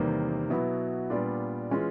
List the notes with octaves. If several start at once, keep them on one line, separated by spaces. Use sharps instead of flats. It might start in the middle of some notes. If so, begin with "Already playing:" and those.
Already playing: E2 C3 D#3 G3 A#3
B2 F#3 B3 E4
A#2 G3 B3 D4 F4
E3 G#3 C#4 F4